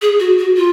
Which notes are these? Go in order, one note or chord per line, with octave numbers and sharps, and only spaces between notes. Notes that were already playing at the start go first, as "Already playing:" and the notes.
G#4
F#4
F#4
F4